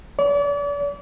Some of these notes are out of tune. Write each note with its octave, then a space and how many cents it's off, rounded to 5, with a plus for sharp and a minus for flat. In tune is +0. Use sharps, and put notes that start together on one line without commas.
D5 -40